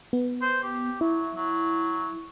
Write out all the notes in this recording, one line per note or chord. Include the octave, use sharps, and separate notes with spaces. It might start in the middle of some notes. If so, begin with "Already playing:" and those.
B3
C5
G4
F#3 E4
F#3